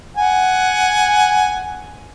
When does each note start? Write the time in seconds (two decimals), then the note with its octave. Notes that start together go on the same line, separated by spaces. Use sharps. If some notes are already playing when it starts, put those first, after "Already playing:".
0.17 F#5 G#5